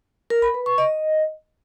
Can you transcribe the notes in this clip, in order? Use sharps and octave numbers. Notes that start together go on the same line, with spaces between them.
A#4
B5
B4
C#6
D#5